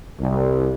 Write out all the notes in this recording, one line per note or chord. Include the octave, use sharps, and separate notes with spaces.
C2